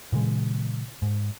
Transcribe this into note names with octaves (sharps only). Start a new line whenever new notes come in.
A#2 C#3 E3 G#3
G#2